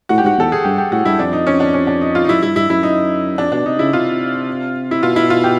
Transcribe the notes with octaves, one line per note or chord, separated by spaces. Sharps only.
A2 F#4
G4
G#2 F#4
E2 A4
G#4
G2 G4
G4
A2 F#4
G2 E4
F2 D4
D#4
C#4
D4
C#4
D4
D#4
F4
D#4
F#2 E4
G2 E4
G2 E4
F#2 E4
D#4
F2 D4
B2 D4
C3 D#4
C#3 E4
C3 F4
E4
B2 F4
E4
F4
G4